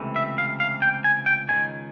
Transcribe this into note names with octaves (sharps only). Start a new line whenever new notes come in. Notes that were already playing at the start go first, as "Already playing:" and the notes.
Already playing: C#2 C3 E3 A3
E5
F5
F5
G5
G#5
G5
C#2 C3 D#3 G#5